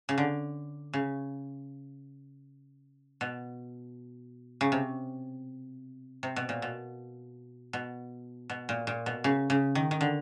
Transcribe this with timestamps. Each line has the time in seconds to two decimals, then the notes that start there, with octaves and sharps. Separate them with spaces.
0.09 C#3
0.18 D3
0.93 C#3
3.21 B2
4.61 C#3
4.72 C3
6.23 C3
6.36 B2
6.49 A#2
6.62 B2
7.73 B2
8.49 B2
8.69 A#2
8.87 A#2
9.06 B2
9.24 C#3
9.50 C#3
9.75 D#3
9.91 D#3
10.01 D3